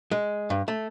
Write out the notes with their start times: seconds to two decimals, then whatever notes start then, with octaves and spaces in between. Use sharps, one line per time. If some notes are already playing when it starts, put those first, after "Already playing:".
0.11 G#3
0.50 G2
0.68 A3